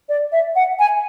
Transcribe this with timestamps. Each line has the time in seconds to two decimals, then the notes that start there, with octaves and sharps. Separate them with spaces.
0.09 D5
0.32 E5
0.56 F#5
0.79 G#5